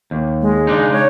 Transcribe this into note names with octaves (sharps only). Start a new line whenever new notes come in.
D#2
G#3
C#3 D4 D#4
C#5